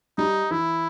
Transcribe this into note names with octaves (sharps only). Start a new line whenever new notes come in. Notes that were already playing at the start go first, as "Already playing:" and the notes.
G3 D#4
E3 E4